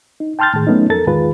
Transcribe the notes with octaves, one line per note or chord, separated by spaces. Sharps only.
D#4
G5 A5 C6 F6 G6 A6
A2 D#3 G#4
F#3 A3 B3 C#4 D#4
F2 A4 A#4 A6
E2 G#2 D#3 F4 G#4 B4